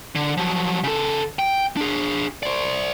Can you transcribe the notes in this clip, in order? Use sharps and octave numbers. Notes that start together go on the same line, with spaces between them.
D3
F3 F#3
C#3 A4
G5
D4 G#4
C5 D5